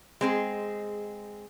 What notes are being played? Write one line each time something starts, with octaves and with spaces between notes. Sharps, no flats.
G#3 C4 G#4